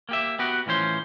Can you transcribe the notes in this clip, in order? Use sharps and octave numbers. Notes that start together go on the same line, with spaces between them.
A#3 G4 E5
B3 F#4 G4 B4
A2 E3 F3 C#4 C5